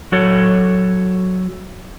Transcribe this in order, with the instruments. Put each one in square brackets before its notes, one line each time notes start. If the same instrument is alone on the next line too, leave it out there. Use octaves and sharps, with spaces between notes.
[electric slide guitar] F#3 F#4 A4 C#5